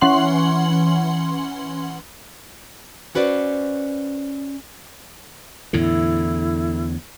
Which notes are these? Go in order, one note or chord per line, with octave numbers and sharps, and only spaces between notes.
E3 C#4 F#5 C6 F#7
C#4 F#4 B4 C5 D5
E2 A2 D3 E4